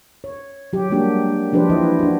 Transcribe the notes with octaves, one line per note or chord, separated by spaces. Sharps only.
C#5
F#3 G4
G3 G#3 A#3 D4 F#4 G4
F3 D4 G4 B4 C5
E3 E4 B4 C5 D#5
D4 F#4